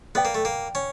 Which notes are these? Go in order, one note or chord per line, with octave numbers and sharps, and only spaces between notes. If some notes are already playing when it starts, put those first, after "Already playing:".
B3 B4 D5 G5
A#3
A3
A#3
C#4